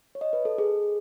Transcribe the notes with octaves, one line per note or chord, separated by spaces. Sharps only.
C#5
D#5
B4
A4
G#4